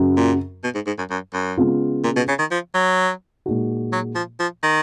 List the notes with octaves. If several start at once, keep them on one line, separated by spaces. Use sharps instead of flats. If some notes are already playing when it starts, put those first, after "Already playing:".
Already playing: F#2 C#3 F#3
A#2
B2
G#2
G#2
F#2
F#2
F#2
C#3 G#3 B3 F4
A#2
B2
C#3
D#3
F3
F#3
A#2 G#3 D#4 F#4
F#3
F3
F3
D#3